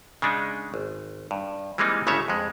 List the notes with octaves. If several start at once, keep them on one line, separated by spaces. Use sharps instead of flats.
C#3 G#3 D4 D#4
G#1
G2
E3 G3 G#3 A#3 C4 D#4
G1 C#3 G#3 A3 C#5 E5
F2 G#3